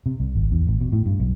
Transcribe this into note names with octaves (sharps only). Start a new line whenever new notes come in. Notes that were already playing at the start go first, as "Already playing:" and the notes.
C3
C2
G#1
E2
A1
B2
A2
G2
B1